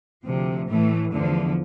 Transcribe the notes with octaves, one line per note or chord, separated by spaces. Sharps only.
D2 C3 F3
A2 E3 A3
E2 D3 F3